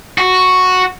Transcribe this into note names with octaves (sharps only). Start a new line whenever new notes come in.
F#4